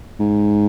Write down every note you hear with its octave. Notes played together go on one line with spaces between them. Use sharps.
G#2